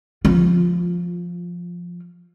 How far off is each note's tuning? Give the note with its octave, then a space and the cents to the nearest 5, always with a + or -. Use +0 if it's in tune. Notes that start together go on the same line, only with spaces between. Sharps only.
F3 +0 F4 +20